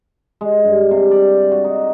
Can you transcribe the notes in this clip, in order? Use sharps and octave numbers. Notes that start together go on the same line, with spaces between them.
G#3
G2
C3
D5
F#4
D#4